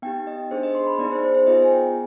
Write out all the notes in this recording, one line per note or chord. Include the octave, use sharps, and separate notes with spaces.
B3 D#4 G4 G5
D#5
D4 G#4 C5
D#5
C6
B5
B3 D#4 G#4 D5
C5
C5
C5
B3 F4 G#4 D#5
G#5
G5